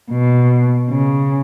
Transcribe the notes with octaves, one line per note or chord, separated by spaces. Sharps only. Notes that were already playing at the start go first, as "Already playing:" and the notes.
B2
C#3